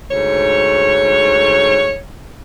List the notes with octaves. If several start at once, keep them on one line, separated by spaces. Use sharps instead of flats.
D2 G#2 C#5